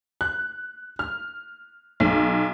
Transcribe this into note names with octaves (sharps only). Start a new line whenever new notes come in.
F#6
F6
B1